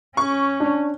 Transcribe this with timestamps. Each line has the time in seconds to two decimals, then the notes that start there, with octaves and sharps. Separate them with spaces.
0.17 C#4 C#6
0.60 D4